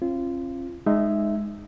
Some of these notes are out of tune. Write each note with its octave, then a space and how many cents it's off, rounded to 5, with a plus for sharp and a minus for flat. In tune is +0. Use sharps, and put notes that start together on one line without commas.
C4 +45 F4 -25
G#3 +0 D#4 -20 E5 +0